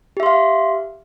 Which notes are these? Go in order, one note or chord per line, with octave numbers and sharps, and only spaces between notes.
G4 E5 F5 C6